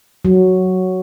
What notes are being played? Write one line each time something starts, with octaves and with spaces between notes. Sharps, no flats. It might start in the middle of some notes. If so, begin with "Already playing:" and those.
F#3